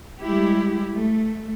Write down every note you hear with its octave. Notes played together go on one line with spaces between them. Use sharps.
G3 G#3 E4 G4
A3